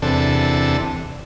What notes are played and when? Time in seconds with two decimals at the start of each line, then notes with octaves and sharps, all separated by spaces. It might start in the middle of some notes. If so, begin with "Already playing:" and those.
0.02 E2 C3 D4 A4